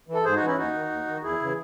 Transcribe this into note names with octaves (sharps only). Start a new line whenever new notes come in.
E3
A4
G#2 G#4 C5
D#4 F#4
E3
C#4 E4
D#2 D#4 F#4
D#3
D#2
D#3
E2 E4 G#4
C#3 E3